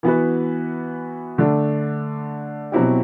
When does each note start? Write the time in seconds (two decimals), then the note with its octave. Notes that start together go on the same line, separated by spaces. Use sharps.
0.03 E3 B3 F#4 B4
1.38 D3 A3 D4
2.72 B2 F#3 C4 E4 G4